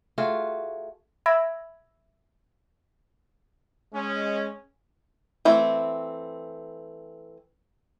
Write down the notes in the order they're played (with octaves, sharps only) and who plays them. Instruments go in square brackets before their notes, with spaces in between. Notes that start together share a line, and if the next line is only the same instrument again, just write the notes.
[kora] A3 F4 F#4 G#4
[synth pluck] E5 B5 E6 G#6 A#6 D7
[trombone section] G#3 C#4
[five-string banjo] E3 A3 C4